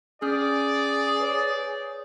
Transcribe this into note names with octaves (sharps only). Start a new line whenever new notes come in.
C#4 G#4 D5 F6 G6
B4 C#5